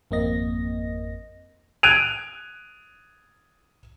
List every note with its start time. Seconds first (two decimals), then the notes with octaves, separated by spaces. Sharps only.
0.11 G#1 F2 A#3 C4 D#5 A#6
1.83 F#6 G#6 D7 D#7 F7